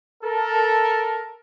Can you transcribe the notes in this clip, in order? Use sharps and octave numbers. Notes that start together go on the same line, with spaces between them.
A4 A#4